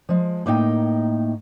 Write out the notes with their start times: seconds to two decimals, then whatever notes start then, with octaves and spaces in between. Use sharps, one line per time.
0.09 F3 G#3
0.46 A2 A#3 D#4 D#5 G5